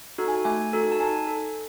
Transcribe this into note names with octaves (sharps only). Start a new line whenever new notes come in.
D#4 F#4 A4
G#5
A3 G#5
D#4 F#4 A4
A5
D#4 G#5
A4